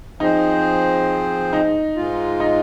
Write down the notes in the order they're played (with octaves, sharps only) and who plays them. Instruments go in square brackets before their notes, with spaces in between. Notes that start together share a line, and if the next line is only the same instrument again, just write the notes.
[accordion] F3 C4 G#4 C5 [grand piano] D#4
[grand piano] D#4
[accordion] G#2 G#3 F4
[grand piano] D#4